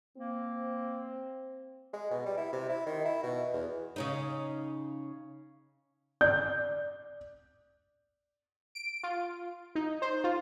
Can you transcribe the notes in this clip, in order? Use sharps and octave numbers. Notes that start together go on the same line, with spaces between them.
A#3 C4
G#3
B2
G3
E4
C3
E4
D#3
E4
B2
E2
C#3 C#4 D#4
D5 G6
D7
F4
D#4
C5
F4